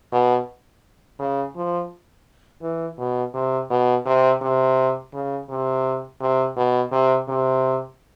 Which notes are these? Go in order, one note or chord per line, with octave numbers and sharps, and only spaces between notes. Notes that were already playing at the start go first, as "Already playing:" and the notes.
B2
C#3
F3
E3
B2
C3
B2
C3
C3
C#3
C3
C3
B2
C3
C3